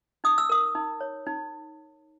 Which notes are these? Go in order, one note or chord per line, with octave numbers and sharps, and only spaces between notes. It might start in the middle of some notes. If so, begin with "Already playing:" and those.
D#4 D#6
E6
A#4 D#6
D#4
C#5
D#4